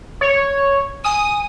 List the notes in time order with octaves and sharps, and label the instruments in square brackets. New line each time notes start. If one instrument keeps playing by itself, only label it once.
[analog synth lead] C#5
[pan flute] G#5 [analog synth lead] D#6